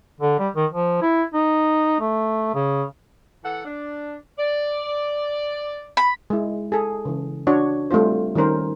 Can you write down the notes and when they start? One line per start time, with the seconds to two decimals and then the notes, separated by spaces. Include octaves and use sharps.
0.21 D3
0.39 G3
0.56 D#3
0.72 F3
1.02 E4
1.34 D#4
2.00 A3
2.55 C#3
3.44 E3 A4 F#5
3.65 D4
4.38 D5
5.97 B5
6.30 G#3 E4
6.72 G#4 A4
7.05 C#3 E3
7.47 D4 F#4 C#5
7.91 G3 A3 C4 F4 C5
8.35 D#3 G3 C#4 A#4 C5